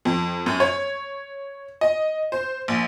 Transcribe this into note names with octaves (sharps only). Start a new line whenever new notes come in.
F2
F#2
C#5
D#5
C5
A#1